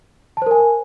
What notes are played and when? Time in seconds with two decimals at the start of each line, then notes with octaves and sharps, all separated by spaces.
0.37 A5
0.42 C5
0.46 A#4
0.51 G#5